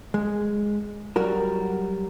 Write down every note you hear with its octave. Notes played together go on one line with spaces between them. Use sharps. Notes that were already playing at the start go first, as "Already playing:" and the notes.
G#3
F#3 G3 F#4 A#4